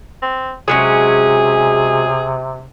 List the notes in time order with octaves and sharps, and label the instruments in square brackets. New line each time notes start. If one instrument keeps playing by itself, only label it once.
[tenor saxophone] C4
[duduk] C3 [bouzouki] F#3 G#3 C#4 [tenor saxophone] G#4